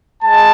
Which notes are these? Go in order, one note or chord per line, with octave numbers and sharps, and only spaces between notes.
G#3 A5